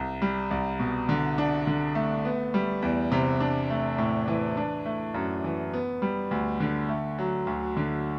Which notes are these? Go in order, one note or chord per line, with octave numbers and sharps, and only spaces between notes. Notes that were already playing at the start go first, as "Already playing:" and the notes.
Already playing: C2
G3
C2
B2
D3
D4
D3
A3
B3
G3
E2
C3
D4
A3
A2
E3
D4
A3
F#2
E3
B3
G3
D2
D3
A3
F#3
D2
D3